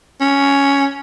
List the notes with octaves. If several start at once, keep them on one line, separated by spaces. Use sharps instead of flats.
C#4